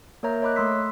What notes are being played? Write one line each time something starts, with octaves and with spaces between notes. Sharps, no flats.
A#3 A#4 C#5 E5 A#5 G6
C#5 D#5 B5 D6 F#6
A3 B5 C6 E6 B6